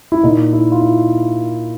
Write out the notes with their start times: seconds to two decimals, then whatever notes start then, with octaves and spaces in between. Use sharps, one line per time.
0.12 E4
0.23 A#2 D#4
0.53 E4
0.72 F4
0.82 E4